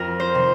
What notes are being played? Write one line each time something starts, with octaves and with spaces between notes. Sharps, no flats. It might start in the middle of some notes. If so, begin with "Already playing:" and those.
Already playing: F2 A#4
C5
C3 D#3